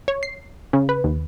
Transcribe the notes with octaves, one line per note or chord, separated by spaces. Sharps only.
C#5
C7
C#3
B4
D#2